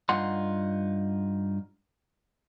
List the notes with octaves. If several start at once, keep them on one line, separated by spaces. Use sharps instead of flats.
G2 D#4 F4 F#5 C6